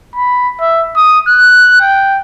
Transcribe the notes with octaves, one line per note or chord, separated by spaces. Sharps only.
B5
E5
D#6
F#6
G5